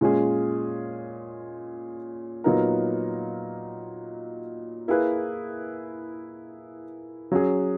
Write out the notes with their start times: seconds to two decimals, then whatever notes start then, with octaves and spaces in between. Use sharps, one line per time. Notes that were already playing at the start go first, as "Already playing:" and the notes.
0.01 A#2 G#3 C#4 G#4
2.44 A#2 F#3 B3 D#4 A#4
4.88 A#3 E4 G#4 B4
7.32 F#3 C#4 G#4